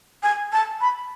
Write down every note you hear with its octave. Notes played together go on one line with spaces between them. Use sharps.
G#5
A5
B5